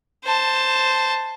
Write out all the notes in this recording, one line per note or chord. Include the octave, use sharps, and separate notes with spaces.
C5 A5